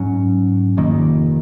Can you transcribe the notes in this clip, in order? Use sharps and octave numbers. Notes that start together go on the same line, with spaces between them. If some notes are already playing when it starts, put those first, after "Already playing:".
Already playing: G#2 F#3 C#4
F1 F2 D#3 A#3